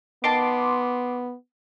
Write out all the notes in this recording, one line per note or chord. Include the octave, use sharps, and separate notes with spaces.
D#3 B3 A5 C6 D6